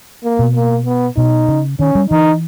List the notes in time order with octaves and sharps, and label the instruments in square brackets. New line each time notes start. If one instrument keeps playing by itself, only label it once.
[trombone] A#3
[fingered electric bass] B2
[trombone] A#3
B3
[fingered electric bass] B2 [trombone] D#4
[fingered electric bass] C#3
[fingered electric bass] D#3 [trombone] C#4
[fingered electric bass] G3
[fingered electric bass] E3 [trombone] D#4